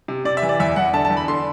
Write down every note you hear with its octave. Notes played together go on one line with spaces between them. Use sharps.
C3
C3 D5
E5
E3
D5
E2 E5
E2 F#5
D3 A5
A5
E2
B5
D3 C6